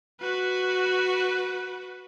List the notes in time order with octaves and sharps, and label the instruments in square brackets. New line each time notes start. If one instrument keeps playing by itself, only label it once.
[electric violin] F#4 B4